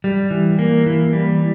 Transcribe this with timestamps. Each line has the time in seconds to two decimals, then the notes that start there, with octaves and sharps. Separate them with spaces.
0.04 G3
0.31 E3
0.59 A#3
0.86 E3
1.13 G3